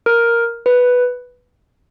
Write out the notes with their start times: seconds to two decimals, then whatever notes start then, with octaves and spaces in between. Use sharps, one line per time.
0.06 A#4
0.66 B4